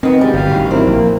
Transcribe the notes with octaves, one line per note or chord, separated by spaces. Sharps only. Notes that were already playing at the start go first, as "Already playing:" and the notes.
D#3 B3 C4 A#4
F#2 A#2 C#3 G3 G#3
G1 E3 G4 F5
A1 A2 D#3
F#3 C4 E4 A#4
A#1 A#3